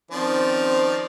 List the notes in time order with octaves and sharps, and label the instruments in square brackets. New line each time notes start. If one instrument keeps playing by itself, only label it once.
[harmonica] D#3 F3 D5 [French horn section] C4 C#4 C5